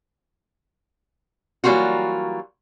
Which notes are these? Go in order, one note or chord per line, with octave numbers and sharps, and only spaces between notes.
E3 F#3 G3 A#3 F4 F#4